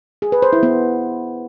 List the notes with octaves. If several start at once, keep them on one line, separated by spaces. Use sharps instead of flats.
G#4
B4
C5
E4
B3